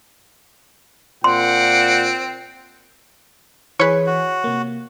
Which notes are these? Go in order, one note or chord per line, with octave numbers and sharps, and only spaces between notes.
A#2 C4 F#5 C6
E3 G#4 B4 C#5
F#4
C3 A#3